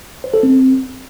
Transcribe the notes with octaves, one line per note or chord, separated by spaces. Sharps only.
C5
A4
C4